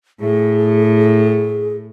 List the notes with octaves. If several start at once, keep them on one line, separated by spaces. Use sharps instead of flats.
A2 G#4